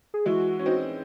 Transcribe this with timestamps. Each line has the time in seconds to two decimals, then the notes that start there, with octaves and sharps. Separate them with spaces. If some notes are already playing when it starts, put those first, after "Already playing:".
0.14 G#4
0.26 E3 G#3 F#4
0.59 C#4
0.66 C4 D#4